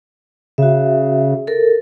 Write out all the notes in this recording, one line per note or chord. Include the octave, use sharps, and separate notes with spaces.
C#3 F#4 E5
A4 A#4